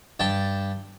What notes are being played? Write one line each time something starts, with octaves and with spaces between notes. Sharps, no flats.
G2 G5 A5